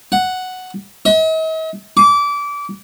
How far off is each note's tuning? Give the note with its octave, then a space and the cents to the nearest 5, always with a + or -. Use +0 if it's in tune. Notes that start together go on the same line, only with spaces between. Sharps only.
F#5 +0
D#5 +45
D6 -25